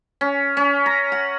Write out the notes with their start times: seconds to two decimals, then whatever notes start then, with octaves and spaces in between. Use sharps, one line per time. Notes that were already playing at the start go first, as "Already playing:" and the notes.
0.21 C#4
0.57 C#4
0.86 A#5
1.12 F#5